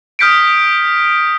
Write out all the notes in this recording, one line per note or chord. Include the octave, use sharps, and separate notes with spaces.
D#6 F6 G6 B6 C#7 D7